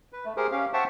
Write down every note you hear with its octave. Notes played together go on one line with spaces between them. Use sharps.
B4
A3
G4 G#4 A#4 C5
C#4 G4 F5
C5 E5 F#5 G5 A5 C#6